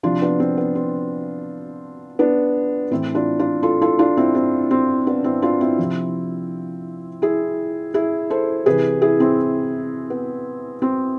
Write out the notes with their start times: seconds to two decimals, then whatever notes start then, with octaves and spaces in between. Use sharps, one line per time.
0.03 C3 F3 D4 F4
0.21 B3 D4
0.40 C4
0.57 B3
0.75 C4
2.19 B3 D4
2.91 A2 E3 C4 E4
3.15 D4 F4
3.39 D4 F4
3.63 F4 A4
3.82 F4 A4
3.99 D4 F4
4.17 C4 E4
4.35 C4
4.71 C4
5.07 B3 D4
5.24 C4 E4
5.42 D4 F4
5.61 C4 E4
5.78 C3 F3
7.22 E4 G#4
7.94 E4 G#4
8.30 A4 C5
8.66 C3 E3 G#4 B4
9.02 E4 G#4
9.20 C4 E4
10.10 B3
10.82 C4